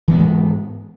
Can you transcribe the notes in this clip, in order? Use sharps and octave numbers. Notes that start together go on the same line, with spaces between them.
G#2 E3 G#3 B3